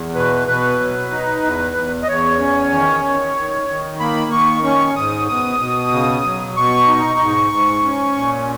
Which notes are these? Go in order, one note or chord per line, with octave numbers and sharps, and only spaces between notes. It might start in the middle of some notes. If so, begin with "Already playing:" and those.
Already playing: E2
B2 B4
B2 B4
F#3
D#4
E2
E2
D#5
E2 C#5
C#4
D#3
D#3
D#3
D#3
A#3 B5
D#3 C#6
C#4 C#6
G#2 D#6
B2 D#6
B2
C#3
F#3
B2 C#6
D#4
G#2
G#2
C#4
A#2